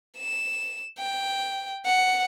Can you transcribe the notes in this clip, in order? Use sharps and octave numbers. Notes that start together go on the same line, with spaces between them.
E7
G5
F#5